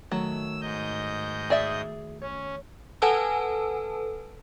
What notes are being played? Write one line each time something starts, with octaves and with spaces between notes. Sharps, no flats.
D#3 F#3 A3 F#4 E6
G#2 D#5 G6
G#4 D5 E5
C#4 C#5
A4 B4 F#5 G#5 A5 E6